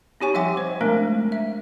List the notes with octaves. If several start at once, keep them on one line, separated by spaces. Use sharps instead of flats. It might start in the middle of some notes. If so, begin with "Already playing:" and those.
C4 D#4 G4 C#5 G#5 C#6
F3 G3 E5 F#5 G5 D6
C5
G#3 A3 C4 D4 A#4
E5